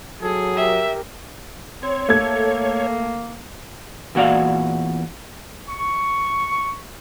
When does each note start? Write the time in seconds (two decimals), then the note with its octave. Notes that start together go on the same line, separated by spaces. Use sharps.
0.22 F#3 G#4 A4
0.57 G4 A#4 E5
1.83 C4 C#5
2.09 A3 A#3 A4 G#6
4.15 E2 A#2 F#4 D5 F5
5.69 C#6